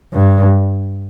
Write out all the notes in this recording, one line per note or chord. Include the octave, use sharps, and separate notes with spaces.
G2